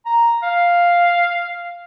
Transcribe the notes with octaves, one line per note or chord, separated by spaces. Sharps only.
A#5
F5